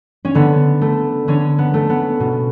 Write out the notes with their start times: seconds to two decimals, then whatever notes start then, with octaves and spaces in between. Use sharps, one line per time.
0.25 C#4
0.35 D3 B3
0.81 A3
1.28 D3 C#4
1.58 B3
1.74 A3
1.89 B3
2.20 B2